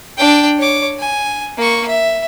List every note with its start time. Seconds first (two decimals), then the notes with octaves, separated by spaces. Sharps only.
0.17 D4 G5
0.58 C#5 D6
0.99 G#5
1.57 A#3 C#6
1.88 E5